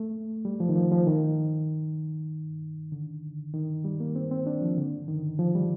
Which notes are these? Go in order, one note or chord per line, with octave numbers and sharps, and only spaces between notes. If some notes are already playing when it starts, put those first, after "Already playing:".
Already playing: A3
G3
F3
D#3
F3
F3
D#3
D3
D#3
G3
A#3
C4
C4
D4
F3
D3
D#3
F3
G3